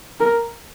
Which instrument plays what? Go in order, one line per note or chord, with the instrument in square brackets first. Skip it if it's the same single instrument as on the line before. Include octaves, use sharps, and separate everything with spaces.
[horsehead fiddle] A#4